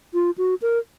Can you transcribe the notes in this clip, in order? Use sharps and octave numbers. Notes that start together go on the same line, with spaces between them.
F4
F#4
A#4